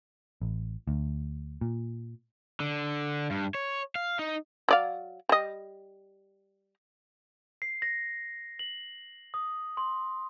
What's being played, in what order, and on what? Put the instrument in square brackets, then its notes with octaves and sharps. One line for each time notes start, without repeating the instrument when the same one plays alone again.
[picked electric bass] A1
D2
A#2
[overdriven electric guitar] D3
G2
C#5
F5
D#4
[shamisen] F#3 D5 F5
G3 D#5
[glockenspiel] C7
A#6
F#7
D#6
C6